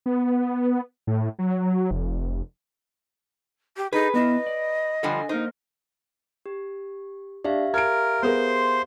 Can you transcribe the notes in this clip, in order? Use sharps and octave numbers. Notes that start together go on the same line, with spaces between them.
B3
A2
F#3
F1
G4
D#4 G#4 B4
B3 E4 D#5
D5
D3 F3 G3 A4 F#5 G#5
A#3 D#4 A#4 C5
G4
D4 G4 E5 F5
A#4 G#6 D7
B3 G#4 A#4 C5 C6